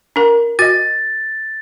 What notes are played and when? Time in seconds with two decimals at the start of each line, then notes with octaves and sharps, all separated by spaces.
0.16 D4 A#4
0.59 F#4 D#5 A6